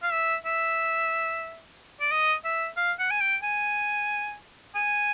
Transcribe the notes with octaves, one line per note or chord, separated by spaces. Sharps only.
F5
E5
E5
D5
D#5
E5
F5
F#5
G#5
G5
G#5
G#5